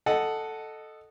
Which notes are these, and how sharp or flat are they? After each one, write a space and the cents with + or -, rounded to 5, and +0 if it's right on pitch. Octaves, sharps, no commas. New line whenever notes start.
A4 +0 D#5 -10 F#5 +0